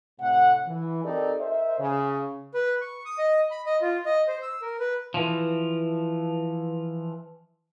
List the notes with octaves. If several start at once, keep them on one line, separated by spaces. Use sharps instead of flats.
A2 C3 F#5
E3
C4 D#4 G4 A4 A#4 D5
A#4 C5 D#5 E5
C#3
B4
C#6
D#6
D#5
B5
D#5
F4
D#5
C5
E6
A#4
B4
E3 F3